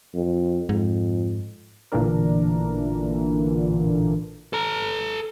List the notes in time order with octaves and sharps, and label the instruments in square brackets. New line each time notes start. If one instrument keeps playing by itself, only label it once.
[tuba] F2
[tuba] F2 [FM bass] G#2
[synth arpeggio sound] A1 A#2 D3 E3 D4 A#4
[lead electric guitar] A4 A#5